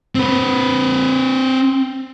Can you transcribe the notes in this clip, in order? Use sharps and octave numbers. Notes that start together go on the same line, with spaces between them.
C4 B4